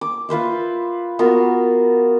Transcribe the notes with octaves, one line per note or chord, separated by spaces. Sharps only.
D6
F4 B4 C5 E5
B3 F4 F#4 A#4